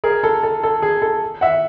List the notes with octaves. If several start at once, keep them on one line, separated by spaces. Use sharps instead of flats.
G#4 A#4
A4
A4
A4
G#4
A4
E5 F#5